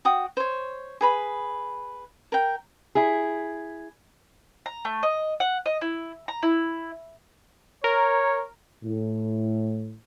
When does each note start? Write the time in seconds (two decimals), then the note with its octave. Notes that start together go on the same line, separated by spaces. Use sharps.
0.05 F#4 G5 D#6
0.37 C5 C#5
1.01 G#4 B4 B5
2.32 A#4 G5
2.95 E4 G#4
4.66 A#5
4.85 A3
5.03 D#5
5.40 F#5
5.66 D#5
5.81 E4
6.28 A#5
6.43 E4
7.84 A#4 C#5
8.83 A2